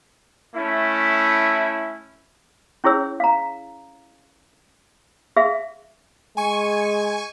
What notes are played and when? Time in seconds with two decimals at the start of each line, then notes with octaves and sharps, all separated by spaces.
0.55 A3 C#4 E4
2.84 C#4 E4 G#4 C#5 E6
3.20 F5 A#5
5.36 G#4 E5 F5
6.37 G#3 G#5 C#6